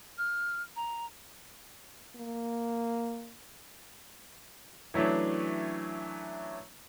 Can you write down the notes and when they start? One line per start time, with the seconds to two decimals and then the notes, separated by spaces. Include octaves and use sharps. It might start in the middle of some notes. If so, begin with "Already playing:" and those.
0.18 F6
0.76 A#5
2.16 A#3
4.94 E3 F#3 A3 C#4 D4